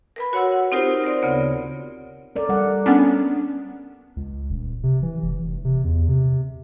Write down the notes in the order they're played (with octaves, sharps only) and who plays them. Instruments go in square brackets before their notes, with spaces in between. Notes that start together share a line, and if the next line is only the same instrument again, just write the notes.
[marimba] A#4 B4 B5
F#4 C#5 F#5 C6 E6
F#5
C4 D#4 F4 G4 A#4 C5
A#4 C5 D5 C6
D2 C#3 B3 C#5
[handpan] A4 A#4 D5
G3 A4 F#5
[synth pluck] B3 C#4 D4
[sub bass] C#2
D#1
C3
E3
F1
C3
E2
C3